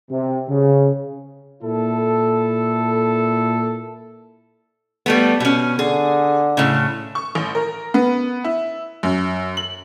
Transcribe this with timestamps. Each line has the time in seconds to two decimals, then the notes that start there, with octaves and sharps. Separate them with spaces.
0.11 C3
0.49 C#3
1.64 A#2 E4 A4
5.06 G3 A3 B3
5.40 B2 C#4
5.79 D3 G#4
6.57 A2 C#3
7.15 C#6
7.35 A1
7.55 A#4
7.94 B3
8.44 E4
9.03 F#2
9.57 F#7